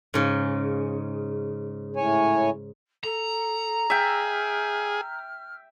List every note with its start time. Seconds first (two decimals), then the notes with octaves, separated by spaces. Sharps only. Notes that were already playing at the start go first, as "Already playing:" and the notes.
0.14 G#2 C#3
1.96 A2 C#5 G#5
3.04 A4 A#5
3.90 G#4 E5 G5 F6